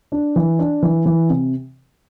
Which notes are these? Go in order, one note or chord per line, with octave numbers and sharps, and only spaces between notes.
D4
E3
D4
E3
E3
C3